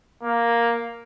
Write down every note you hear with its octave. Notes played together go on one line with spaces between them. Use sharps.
A#3